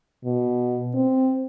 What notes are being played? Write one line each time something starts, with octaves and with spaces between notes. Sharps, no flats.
B2
C4